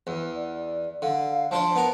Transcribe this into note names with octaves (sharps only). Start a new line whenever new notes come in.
E2
D5
D3 F5
F3 D4 C5 A5
B3 A#4